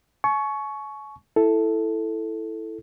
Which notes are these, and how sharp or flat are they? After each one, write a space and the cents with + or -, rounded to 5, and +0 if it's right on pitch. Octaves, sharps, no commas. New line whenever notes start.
G#5 +45 C#6 +5
E4 +0 A4 +0